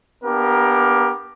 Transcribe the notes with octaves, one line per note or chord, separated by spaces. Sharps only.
A#3 B3 D4 G4 A#4